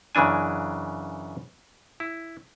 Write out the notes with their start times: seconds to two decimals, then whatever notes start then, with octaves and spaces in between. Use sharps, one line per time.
0.15 F#2 C#3 E3 D4 G#5
2.00 E4